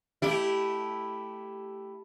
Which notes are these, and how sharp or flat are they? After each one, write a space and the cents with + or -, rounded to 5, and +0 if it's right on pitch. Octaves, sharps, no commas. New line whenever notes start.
A3 +0 E4 +0 G4 +0